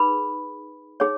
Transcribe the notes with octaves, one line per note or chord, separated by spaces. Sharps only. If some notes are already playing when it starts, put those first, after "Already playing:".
Already playing: D#4 G#4 B4 B5
D#4 G#4 C#5